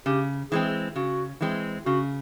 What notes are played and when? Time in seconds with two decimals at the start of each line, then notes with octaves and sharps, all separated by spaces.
0.06 C#3 G4
0.51 E3 G#3 C4 G#4
0.96 C#3 F#4
1.41 E3 G#3 C4
1.86 C#3 F#4